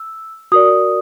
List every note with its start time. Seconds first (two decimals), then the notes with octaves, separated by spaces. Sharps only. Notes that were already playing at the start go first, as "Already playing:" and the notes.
Already playing: E6
0.52 F#4 A#4 D5 D#6